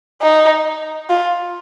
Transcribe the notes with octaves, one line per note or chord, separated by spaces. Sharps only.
D#4
F4